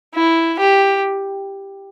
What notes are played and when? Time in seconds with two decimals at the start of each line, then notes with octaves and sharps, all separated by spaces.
0.15 E4
0.59 G4